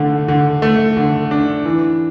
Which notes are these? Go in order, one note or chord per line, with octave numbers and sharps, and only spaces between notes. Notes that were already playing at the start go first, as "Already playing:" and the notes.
Already playing: D3 A3
D3
A3
D3
D4
E3